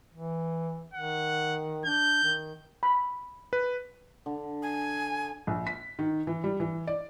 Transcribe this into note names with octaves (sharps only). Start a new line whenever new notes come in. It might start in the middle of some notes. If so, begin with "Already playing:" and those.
E3
D#3 F#5
D4 G6
D#3
B5
B4
D3
G#5
A#1
B6
D#3
E3
G3
E3
D5